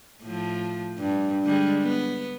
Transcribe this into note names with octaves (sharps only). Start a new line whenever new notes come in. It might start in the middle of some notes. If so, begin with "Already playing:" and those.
A2 F3
G2
D3 G3 G#3
B3